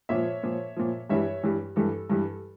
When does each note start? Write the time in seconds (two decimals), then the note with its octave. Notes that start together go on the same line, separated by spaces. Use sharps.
0.09 A#2 F3 C#5 E5
0.43 A#2 F3
0.77 A#2 F3
1.09 G2 E3 G3 C#5 E5
1.43 G2 E3 G3
1.76 G2 E3 G3 A4
2.10 G2 E3 G3